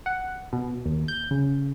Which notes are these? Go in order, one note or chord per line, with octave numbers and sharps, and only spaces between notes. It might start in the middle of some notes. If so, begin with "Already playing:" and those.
F#5
B2
D#2
G6
C#3